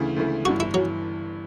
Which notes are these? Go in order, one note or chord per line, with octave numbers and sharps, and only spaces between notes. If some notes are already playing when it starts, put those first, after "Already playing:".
Already playing: D2 C#3 E3 A3 E4
D2 C#3 E3 A3 E4
G1 G2 E3 F#4
E4
E3 F#3